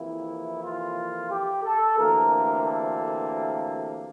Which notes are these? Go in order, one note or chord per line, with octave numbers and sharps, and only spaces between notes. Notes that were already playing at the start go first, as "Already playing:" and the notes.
Already playing: F2 C3 E3 A#3 E4
F4
G4
A4
D2 C3 E3 A#3 A#4
A#4
A4